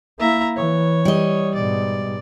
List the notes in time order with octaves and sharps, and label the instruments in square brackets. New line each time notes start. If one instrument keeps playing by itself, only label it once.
[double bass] A#3 E4 [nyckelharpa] E5 A#5
[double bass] E3 [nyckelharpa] C#5
[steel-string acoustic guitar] G3 D#5
[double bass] G#2 B2 [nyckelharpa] D5